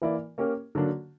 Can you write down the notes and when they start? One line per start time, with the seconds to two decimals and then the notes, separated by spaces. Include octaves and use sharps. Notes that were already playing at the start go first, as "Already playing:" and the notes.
0.02 E3 A#3 E4 A#4 D5
0.38 A#3 C#4 G4 A#4
0.75 D3 F#3 A#3 D4